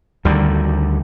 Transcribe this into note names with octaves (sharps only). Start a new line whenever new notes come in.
D2 D3 D#3 G3